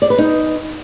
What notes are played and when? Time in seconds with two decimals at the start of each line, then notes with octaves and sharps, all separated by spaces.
0.02 D5
0.10 B4
0.18 D#4